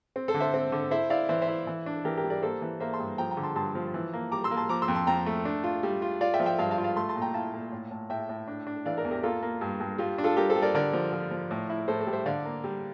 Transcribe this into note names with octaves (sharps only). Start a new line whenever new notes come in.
C4
A4 C5
D3
C5 E5
C4
D3
E4 C5 E5
E4 D5 F5
E3 C5 E5
C5 E5
E4
E3
D4
E3 G4 A#4
G4 A#4
G3
A#4 D5
A#3 A4 C5
E3
A#3 C5 E5
A5 C6
G2
F3 G5 A#5
G5 A#5
D3
A5 C6
G2 A5 C6
F3
E3
A#3
G3 A#5 D6
C6 E6
A#3
A5 C6
F3 A#5 D6
C6 E6
F2
A5 C6
F2 G5 A#5
A3
D4
F4
G3
F4
F4 D5 F5
E5 G5
F3
E5 G5
G2 F5 A5
F5 A5
F4
F5 A5
A3 A5 C6
A5 C6
A#2
G5 A#5
E4 F5 A5
A#2
A2
A2
A2 E5 G5
A2
D4
D4
E3 D5 F5
A#4 D5
E2
G4 A#4
A#3 F4 A4
A#3
G2
G2
G3 F4
D4
F4 A4
G3 G4 A#4
A4 C5
G3
A#4 D5
D3 A#4 D5
F3
F3
F3
A2
E4
A2 A4 C5
A4 C5
G3
C5 E5
D3 D5 F5
A#3
G3